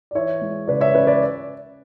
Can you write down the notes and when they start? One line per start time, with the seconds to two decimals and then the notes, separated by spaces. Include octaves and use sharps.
0.11 D5
0.15 E3 C#5 E5
0.41 G#3
0.68 C#3 B4 D5
0.81 C#5 E5
0.94 C#4 B4 D5
1.07 B4 D5